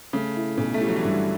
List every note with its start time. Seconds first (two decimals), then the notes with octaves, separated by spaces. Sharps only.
0.13 C#3 A3
0.36 E4
0.57 B1 C#3
0.74 A3
0.80 G3 E4
0.88 F#3
0.96 E3
1.03 G2 D3